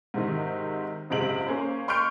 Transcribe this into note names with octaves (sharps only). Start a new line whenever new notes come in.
G#2 C3 D#3
F#1 C#2 G#2 C3 D7 F#7
A#3 C#4 C5
C6 C#6 F6 G6 D7